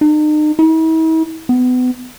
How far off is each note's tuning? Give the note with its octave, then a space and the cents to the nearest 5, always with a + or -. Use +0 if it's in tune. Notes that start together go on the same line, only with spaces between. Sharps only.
D#4 -40
E4 -45
B3 +30